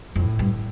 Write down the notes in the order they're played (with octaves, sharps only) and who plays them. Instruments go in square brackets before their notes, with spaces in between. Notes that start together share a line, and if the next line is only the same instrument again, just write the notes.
[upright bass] F2 [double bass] A2
[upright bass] G2